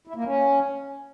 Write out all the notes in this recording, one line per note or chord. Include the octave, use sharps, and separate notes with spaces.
E4
A#3
C#4